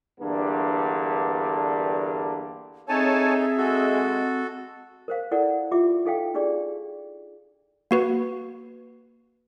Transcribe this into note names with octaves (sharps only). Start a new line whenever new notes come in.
E2 G2 D3 A#3 D4
C4 D#4 G#4 A4 C#5 E5 G#5 A5
G#3 F#4 A4
A#4 C5 F5
E4 A4 A#4 D5 F#5
F4 G4 E5 D6
D#4 A4 F5 G5
D4 D#4 G4 G#4 D5
A#3 F#4 B4